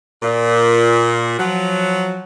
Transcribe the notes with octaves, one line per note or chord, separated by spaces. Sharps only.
A#2
F3 F#3